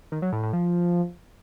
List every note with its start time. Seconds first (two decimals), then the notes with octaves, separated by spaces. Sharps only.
0.12 D#3
0.22 F#3
0.33 A2
0.43 A2
0.53 F3